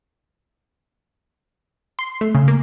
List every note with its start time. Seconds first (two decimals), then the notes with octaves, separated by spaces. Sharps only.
1.99 C6
2.21 A3
2.35 C#3
2.48 A#3